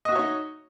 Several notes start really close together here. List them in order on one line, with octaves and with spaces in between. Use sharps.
D#5 F#4 E5 C#5 D#4